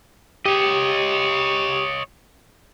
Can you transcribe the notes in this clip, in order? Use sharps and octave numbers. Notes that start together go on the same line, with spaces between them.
G4 C#5 D#5